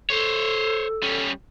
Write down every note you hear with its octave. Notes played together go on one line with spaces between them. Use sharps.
A4 C5 C#5
G3 C#4